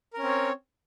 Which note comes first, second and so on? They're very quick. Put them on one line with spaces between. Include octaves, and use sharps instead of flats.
A#4 C#4 C4 C#5